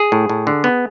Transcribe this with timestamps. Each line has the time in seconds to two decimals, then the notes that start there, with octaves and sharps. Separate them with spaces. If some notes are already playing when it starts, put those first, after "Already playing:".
Already playing: G#4
0.12 A2
0.29 A2
0.47 D3
0.64 B3